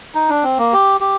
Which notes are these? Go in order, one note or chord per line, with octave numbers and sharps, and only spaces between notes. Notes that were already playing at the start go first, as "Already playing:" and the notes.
D#4
D4
C4
A#3
G4
G4